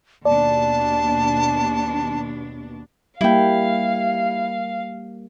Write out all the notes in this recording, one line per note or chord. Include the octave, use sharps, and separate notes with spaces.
D#2 B2 D4 D5 A5
G3 A#3 E4 F5 G5